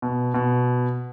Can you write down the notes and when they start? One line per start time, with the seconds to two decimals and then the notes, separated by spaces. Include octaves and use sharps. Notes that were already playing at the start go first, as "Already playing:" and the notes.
0.02 B2
0.34 B2